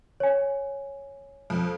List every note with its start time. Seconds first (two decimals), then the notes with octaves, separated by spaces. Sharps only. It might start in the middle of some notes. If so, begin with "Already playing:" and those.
0.20 C#5 G#5
1.50 F2